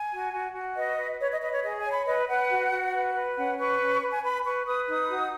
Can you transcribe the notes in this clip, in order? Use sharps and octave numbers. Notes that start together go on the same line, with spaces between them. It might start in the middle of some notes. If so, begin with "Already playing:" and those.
Already playing: G#5
F#4
F#4
F#4
B4 D#5
B4
B4 C#5
D#5
B4 D#5
C#5
G#4 D#5
G#5
C#5
B5
B4 D#5
B4 F#5
F#4
F#4
B4
B4
C#4 F#5
B4 C#6
C#4
B4
G#5
B4 B5
B4 C#6
B4 D#6
D#4 D#6
F#4